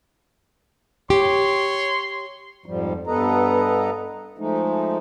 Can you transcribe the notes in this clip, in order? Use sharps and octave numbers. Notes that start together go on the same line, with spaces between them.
G4 C#5 C6
F2 G#2 F3 G3
G2 B3 A4 B4 D#5 A#5
F3 G#3 A3 D#4